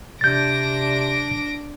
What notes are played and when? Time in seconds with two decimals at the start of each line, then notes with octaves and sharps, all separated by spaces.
0.21 C3 D4 G6 A6 A#6 D7